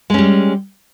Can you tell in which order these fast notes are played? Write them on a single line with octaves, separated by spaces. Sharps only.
G#3 C#4 G3